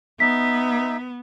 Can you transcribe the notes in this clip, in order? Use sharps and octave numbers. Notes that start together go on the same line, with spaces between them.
B3 D#4 E5 B6